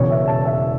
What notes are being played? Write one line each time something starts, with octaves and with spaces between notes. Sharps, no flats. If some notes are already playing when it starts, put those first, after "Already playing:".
Already playing: E1 E2 C#3 C#5
E5
A5
E5